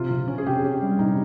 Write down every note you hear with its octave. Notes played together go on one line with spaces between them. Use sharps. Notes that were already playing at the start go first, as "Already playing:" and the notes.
Already playing: C3 F4
C3
C#4
G#4
C3 G4
C#4
G3
C3 D#4